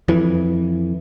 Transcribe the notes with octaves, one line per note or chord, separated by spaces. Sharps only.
F2 E3